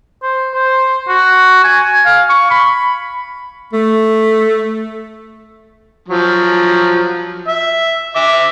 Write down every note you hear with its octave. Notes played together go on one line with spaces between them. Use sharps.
C5
C5
F#4
G#5
F5
C#6
B5
A3
F3 F#3
E5
E5 D6 E6